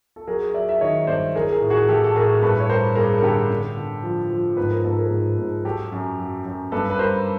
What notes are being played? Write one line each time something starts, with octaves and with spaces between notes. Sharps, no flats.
A4
F#3 G#4 A#4
F#3 D5 E5
E5
D#3 C#5 D#5
G2 C5 D5
E3 G#4 A#4
G#4 A#4
A2
F#4 G#4
E3 G4 A4
A4
A2 G#4 A#4
G2 A4 B4
C#5
G3 A#4 C5
G2 G#4 A#4
A#4
D3 G4 A4
D3
D3
F3
F3
G#2 B4
A#4
G#2 A4
G#4 A#4
G#2
G#2
F#3 G4 A4
F#2
F#3
F#2
G2 A4 B4
B4
G3 A#4 C5